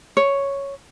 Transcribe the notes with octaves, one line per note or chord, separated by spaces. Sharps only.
C#5